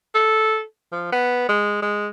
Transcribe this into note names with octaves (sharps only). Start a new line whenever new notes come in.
A4
F3
B3
G#3
G#3